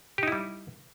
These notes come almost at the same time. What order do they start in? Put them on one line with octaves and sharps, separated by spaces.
G4 D#4 E4 G3